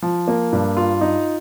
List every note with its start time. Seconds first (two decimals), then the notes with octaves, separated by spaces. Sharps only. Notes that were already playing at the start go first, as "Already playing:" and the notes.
0.02 F3
0.28 A#3
0.52 G2
0.77 F4
1.01 D#4